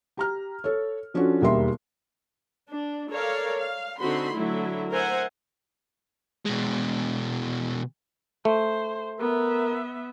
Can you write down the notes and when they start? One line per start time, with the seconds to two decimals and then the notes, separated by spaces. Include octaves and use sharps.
0.17 G4 A#5 F6
0.64 A4 C#5
1.14 F3 C#4 D4 F4 F#4 A4
1.41 E1 D#2 G3 A#4 E5 C6
2.69 D4
3.11 A4 A#4 C#5 D5 F5
3.57 F5
3.98 D3 C4 D#4 F#4 B5 C6
4.33 D3 F#3 A3 E4
4.91 A#4 C5 E5 F#5 G#5
6.46 B2 G#3
8.45 A3 C5
9.20 B3 A#4 E5